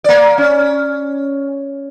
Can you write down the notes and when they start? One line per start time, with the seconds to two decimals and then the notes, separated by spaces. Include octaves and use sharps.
0.04 A#3 D5
0.38 C#4